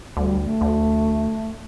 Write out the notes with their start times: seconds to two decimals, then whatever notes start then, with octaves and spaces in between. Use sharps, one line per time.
0.17 D2 G3
0.45 A3
0.61 D2